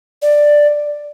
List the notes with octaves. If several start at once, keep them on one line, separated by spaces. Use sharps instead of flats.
D5